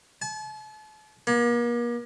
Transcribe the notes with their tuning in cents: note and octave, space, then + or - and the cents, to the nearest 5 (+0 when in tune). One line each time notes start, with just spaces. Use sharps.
A5 -40
A#3 +40